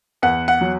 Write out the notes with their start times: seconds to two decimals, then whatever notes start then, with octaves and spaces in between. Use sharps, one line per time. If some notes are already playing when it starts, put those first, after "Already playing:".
0.22 E2 F#5
0.48 F#5
0.61 F#3